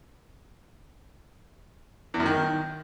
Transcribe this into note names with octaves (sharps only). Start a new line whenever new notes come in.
E2
F#2
D#3